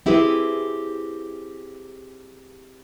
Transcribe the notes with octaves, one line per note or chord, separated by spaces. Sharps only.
C4 E4 G4 G#4 B4